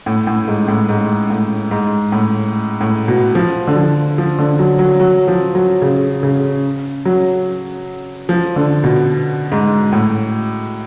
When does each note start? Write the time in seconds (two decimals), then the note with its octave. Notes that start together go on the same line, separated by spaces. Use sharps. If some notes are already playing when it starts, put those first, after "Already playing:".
0.06 A2
0.27 A2
0.48 G#2
0.68 A2
0.89 G#2
1.30 A2
1.71 G#2
2.12 A2
2.81 A2
3.08 B2
3.35 F3
3.67 D3
3.76 F3
4.18 F3
4.39 D3
4.59 F#3
4.79 F#3
5.00 F#3
5.28 F3
5.55 F#3
5.82 C#3
6.23 C#3
7.05 F#3
8.29 F3
8.56 D3
8.84 B2
9.52 G#2
9.92 A2